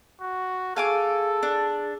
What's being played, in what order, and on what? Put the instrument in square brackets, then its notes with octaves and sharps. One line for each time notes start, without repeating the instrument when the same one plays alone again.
[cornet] F#4
[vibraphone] G#4 [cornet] A4 [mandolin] F5 G#5 D6
[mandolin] D4